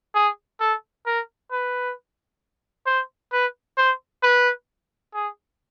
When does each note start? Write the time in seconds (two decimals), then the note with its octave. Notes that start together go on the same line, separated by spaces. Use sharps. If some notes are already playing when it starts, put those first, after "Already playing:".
0.15 G#4
0.60 A4
1.06 A#4
1.52 B4
2.86 C5
3.33 B4
3.77 C5
4.23 B4
5.14 G#4